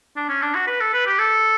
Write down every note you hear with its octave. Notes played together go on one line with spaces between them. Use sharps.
D4
C#4
D4
F#4
B4
A4
B4
G4
A4